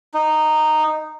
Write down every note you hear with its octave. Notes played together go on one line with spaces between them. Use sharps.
D#4